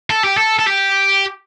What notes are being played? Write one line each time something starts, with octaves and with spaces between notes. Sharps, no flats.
A4
G4
A4
A4
G4